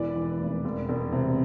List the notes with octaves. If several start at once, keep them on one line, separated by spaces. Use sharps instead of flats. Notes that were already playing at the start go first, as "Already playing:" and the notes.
Already playing: E1 E3 B4 D5
E3
F1
E1
E1
C3